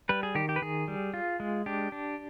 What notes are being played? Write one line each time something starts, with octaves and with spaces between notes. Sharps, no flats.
G3 B4
G#4
D#3 G4
G4
B4
D#3 G#4
G3
F4
G#3
D4 G4
D4